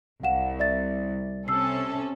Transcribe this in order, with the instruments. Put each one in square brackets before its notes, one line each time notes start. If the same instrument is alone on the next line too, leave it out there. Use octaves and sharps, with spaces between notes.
[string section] C2 [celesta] F5 F#5 E7
[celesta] D5 E5 A6
[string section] C3 C#4 A4 [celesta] E6 C7